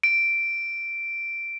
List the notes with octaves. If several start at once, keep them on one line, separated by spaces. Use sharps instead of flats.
D7